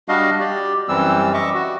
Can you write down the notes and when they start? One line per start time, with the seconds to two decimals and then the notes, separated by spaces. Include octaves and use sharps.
0.08 G3 D4 F#4 D#5 F5
0.40 G4 D5
0.88 F#2 E3 G3 C4 E6
1.34 D#5 E5 C#6 D6
1.54 F#4